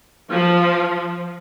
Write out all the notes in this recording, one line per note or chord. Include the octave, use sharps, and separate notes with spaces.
F3